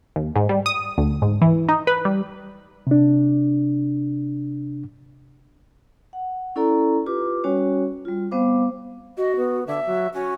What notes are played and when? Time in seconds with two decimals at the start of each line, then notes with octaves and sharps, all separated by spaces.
0.16 D#2
0.36 G#2
0.49 G3
0.66 D#6
0.98 D2
1.22 G#2
1.42 E3
1.69 D#4
1.87 B4
2.05 G3
2.87 C3 D4
6.13 F#5
6.56 C#4 E4 A4 D5 A#5
7.06 F4 G4 B4 D6
7.44 G3 C#4 F#4 C#5 G#5
8.05 G3 F4
8.31 G3 B3 C4 C5 F5 D6
9.17 F#4 D#5
9.36 B3
9.67 D3 E5
9.86 F#3
10.14 C#4 F#4